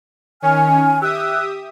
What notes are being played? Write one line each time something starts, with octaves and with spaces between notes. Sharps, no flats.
D#3 C#4 C#5 G#5 F6
G4 E5 D#6 E6 F#6